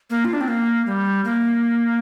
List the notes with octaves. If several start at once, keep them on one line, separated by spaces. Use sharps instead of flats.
A#3
F4
D4
C4
A#3
G3
A#3